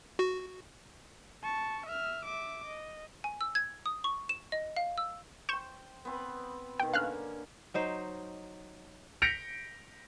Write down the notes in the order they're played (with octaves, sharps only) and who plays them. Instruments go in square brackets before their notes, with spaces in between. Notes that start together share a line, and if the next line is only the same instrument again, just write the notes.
[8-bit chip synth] F#4
[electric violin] A5 C#6
E5 F6
E5 D6
D#5
[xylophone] G#5
E6
G#6
D#6
C#6
E7
D#5
F5
E6
[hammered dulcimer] C5 G5 [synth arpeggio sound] C#6 G6 E7
[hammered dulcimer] B3 C4 B5
[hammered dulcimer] B2 D#3 [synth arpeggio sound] G5
[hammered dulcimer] D3 A#3 C#4 [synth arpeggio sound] F5 F6 F#6
[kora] F#3 D#4 C5
[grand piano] G6 A#6 B6 C#7 D7 F7